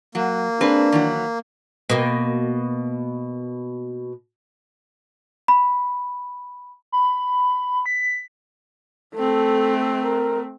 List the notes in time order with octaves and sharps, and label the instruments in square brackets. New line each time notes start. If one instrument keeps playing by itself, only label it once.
[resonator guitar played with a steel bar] F#3 [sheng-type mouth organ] A#3
[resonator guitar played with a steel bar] C4 G#4 B4 [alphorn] D4
[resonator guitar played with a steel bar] D#3 E3 F#3
[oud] B2 A#3
[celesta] B5
[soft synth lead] B5
B6
[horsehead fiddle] A3 C4 [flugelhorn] A4
[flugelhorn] A#4